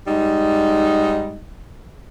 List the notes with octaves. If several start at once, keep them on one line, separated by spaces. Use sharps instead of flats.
G#2 G3 D#4